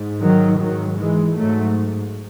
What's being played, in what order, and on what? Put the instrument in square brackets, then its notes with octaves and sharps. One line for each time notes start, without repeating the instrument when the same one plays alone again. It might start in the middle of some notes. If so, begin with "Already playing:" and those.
Already playing: [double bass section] G#2
D#3 F#3
G#2 D#3 F#3
E3 G#3
G#2 F#3 A3